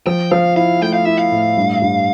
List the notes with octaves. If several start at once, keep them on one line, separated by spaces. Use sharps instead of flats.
F3 G5
F3 F5
E4 F5
A3 G5
F5
E4 E5
F5
A2
G2
G2